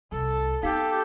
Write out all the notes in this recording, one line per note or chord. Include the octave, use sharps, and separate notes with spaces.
C2 A4
B3 C4 D#4 G4 A4 F5 B6